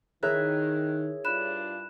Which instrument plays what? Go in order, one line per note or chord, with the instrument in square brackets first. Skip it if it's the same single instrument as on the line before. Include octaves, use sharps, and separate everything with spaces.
[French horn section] D#3 [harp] E4 A#4 E5 [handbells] G#4 C#5 [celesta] F#6
[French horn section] G2 D4 F4 [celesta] B5 F#6 E7